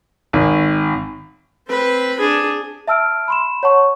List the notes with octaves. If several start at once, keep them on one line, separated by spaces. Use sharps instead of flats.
G#1
C4 B4
D4 G#4
E5 A5 E6 F6 D7
B5 C6 E7
C#5 F#5 A5 C#6